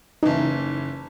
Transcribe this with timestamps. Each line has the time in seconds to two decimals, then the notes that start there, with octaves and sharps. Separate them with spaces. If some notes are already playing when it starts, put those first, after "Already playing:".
0.23 F#1 E3 D#4